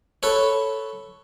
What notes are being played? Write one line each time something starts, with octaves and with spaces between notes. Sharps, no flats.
A4 B4 C#5